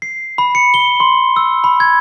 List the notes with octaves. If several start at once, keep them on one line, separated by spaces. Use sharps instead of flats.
C7
B5
C#7
G7
C6
E6
B5
G#6